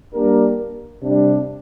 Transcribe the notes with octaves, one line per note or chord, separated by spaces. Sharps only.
G3 A#3 D4 G4 A#4
C3 G3 D4